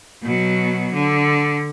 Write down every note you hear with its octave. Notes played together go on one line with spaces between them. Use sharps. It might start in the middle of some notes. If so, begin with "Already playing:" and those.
B2 F#3
D3